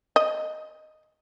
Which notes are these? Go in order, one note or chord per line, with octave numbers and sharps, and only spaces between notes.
D#5